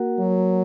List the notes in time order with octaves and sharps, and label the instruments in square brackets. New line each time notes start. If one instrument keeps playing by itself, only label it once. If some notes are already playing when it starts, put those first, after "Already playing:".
Already playing: [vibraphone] A#3 F#4 A#4 F#5
[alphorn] F#3